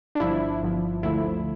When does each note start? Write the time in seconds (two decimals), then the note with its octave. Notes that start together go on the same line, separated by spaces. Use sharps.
0.15 D4
0.20 G1 G2 F3 E4
0.62 G1 G2 F3
1.03 D2 D3 F3 A3 E4